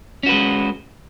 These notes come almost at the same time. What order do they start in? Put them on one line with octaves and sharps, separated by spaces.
C#4 F#4 B4 G#3